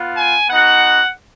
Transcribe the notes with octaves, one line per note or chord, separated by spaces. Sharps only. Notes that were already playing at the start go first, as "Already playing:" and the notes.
Already playing: B3 F4
G#5
B3 D#4 F#4 F#5